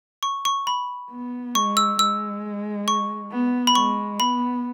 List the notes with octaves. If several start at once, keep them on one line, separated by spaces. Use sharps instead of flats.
C#6
C#6
B5
B3
G#3 C#6
E6
G#3 E6
C#6
B3
B5
G#3 C#6
B3 B5